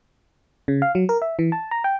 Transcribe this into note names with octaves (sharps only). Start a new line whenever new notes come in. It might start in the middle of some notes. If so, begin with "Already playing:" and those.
C#3
F5
F#3
A#4
E5
E3
A5
A#5
G5